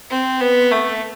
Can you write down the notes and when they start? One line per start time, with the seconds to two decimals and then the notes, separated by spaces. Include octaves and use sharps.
0.10 C4
0.41 B3
0.72 A3